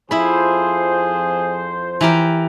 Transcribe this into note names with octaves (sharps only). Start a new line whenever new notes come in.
F2 F3 E4 G#4 C5 B5
E3 G4 A#4